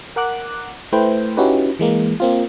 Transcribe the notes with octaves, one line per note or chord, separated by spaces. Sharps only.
A#4 F#5 D6 F#6
A3 E4 B4 C5 G5
C#4 D#4 E4 F#4 G4 B4
E3 G#3 A#3
A#3 C4 F4